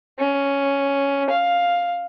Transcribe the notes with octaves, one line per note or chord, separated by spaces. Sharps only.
C#4
F5